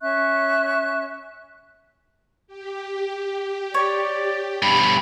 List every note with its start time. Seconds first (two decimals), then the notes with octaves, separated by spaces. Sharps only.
0.01 C#4 E5 C#6 F#6
2.47 G4
3.74 C#5 D5
4.62 G2 B2 B5